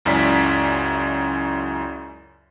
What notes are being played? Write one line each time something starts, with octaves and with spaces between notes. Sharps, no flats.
C#2 F#2 C#4 E4 D5 B6